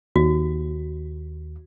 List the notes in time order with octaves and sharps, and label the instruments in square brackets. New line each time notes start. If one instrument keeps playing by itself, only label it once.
[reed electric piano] D#2 [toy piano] F#4